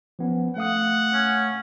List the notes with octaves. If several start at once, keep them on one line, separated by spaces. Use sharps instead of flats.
F3 B3 C#4
A3 F5 F#5 D#6
C#4